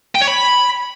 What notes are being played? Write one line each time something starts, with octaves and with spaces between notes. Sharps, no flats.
G5
C#5
B5